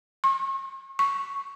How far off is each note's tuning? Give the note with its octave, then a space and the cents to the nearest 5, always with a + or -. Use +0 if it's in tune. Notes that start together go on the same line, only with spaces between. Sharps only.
C#6 -40
C#6 +0